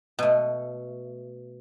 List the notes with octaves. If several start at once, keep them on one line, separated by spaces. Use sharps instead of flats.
B2 A3